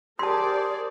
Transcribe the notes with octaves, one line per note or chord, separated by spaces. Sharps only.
G4 G#4 A#4 C5 D5 A5 C6